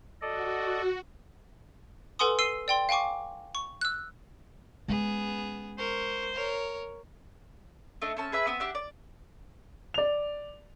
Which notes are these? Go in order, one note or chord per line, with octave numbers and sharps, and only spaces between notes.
F#4 A4 D5 D#5
A4 B4 F#5 G#5 C6 D#6
E6 C7 D#7 G7
D5 G5 C6
F5 G5 G#5 C#6 D6
C#6
E6 F#6
G#3 B3 C#4 G#4
A#4 C5 C#6
A#4 C#5
A3 D4 D#5
C4 C#4 A5
G#4 B4 E5
B3 C4 E5 D#6
D4 G4 E5 F#5
D5
D5 F7